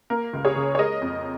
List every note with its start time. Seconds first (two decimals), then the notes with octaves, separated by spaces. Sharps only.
0.10 A#3 A#4
0.33 C#2
0.45 G#4 C#5
0.56 C#3
0.75 C#5
0.78 G#3 A#4 D#5
1.01 F2